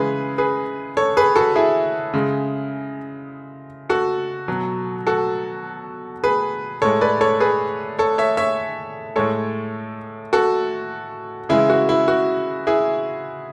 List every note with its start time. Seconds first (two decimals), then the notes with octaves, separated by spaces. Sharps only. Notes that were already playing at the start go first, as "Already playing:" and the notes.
Already playing: C#3 E3 G#3 G#4 B4
0.38 G#4 B4
0.97 A4 C#5
1.17 G#4 B4
1.36 F#4 A4
1.56 E4 G#4
2.14 C#3 G#3
3.89 F#4 A4
4.48 B2 F#3
5.07 F#4 A4
6.24 G#4 B4
6.82 A2 G#3 A4 C#5
7.01 B4 D5
7.21 A4 C#5
7.40 G#4 B4
7.99 A4 C#5
8.18 C#5 E5
8.37 C#5 E5
9.16 A2 G#3 A4 C#5
10.33 F#4 A4
11.49 C#3 E3 G#3 E4 G#4
11.70 F#4
11.89 E4
12.08 F#4
12.67 E4 G#4